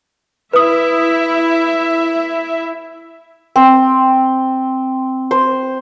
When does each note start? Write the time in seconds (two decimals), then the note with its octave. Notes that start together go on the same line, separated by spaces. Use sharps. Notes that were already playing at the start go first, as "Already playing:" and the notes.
0.53 E4 B4 E5 D#6
3.56 C4
5.31 C5